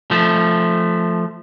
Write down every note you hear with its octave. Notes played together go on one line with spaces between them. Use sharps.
F3 A3